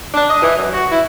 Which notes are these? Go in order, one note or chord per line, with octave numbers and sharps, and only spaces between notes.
D4
D#5
E3
F#2
F#4
E4